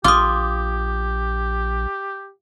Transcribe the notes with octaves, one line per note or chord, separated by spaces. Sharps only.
A#1 F4 G4 D6 D#6